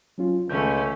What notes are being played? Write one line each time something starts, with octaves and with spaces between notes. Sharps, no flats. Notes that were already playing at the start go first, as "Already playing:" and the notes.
F#3 C#4 F4
C#2 D#3 A3 C#4 G6